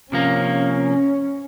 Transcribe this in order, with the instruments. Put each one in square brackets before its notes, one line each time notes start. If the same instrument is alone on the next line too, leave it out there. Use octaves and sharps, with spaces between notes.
[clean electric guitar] C3 F3 A#3 [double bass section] C#4